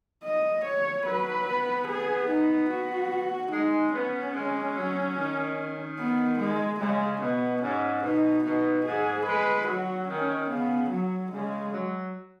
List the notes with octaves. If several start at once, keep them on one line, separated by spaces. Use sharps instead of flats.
D#5
C#5
F#3 B4
B3
G#4
D#4
F#4
G#3 D#4
B3 C#4
G#3
F#3
D#3
B3
G#3
C#3 G#3
B2 B3
G#2 C#4
B2 D#4
B2 D#4
G#2 G#4
G#3 B4
F#3 F#4
D#3 C#4
C#3 B3
F#3
C#3 G#3
F#3